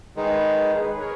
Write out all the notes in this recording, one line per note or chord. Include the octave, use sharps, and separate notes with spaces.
D#3 G#3 D#4 G#4 B4
A#4 C#5